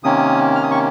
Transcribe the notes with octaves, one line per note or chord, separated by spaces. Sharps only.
C3 D#3 A#3 C#4 D#6
F6
D#6
C#6